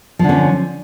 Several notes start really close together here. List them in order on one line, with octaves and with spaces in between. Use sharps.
F3 D3 C#4